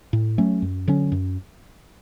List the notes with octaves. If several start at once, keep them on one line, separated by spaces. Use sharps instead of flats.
A2
F#3 A3 C#4
F#2
D3 F#3 C#4
F#2